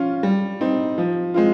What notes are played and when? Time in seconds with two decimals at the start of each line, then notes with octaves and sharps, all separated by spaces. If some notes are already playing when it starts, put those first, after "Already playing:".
Already playing: F3 C#4 F4
0.23 G3
0.61 C4 D#4
0.98 F3
1.34 G#3 C4 F4